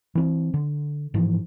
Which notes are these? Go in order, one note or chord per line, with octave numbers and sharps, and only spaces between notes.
E3 C4
D3
G#2 E3 F3